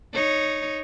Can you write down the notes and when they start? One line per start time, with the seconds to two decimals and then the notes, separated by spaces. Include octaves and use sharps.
0.13 D#4 C#5